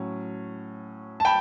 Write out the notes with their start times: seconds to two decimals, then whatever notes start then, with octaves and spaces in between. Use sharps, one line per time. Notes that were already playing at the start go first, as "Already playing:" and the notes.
Already playing: A2 F#3 C#4
1.20 A5
1.25 G5 B5